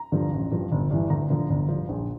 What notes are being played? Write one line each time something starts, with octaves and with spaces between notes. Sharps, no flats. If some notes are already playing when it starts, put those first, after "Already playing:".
Already playing: A#5
G2 D3 F3
A1
G2 F3
G1
G2 E3
D2 A#5
D3 F3
G1
G2 F3
A#1